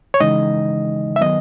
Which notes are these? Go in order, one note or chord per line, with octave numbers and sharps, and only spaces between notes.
C#5
C#3 E3 G#3 D#4 D#5
E5
D#3 F#3 B3 D#5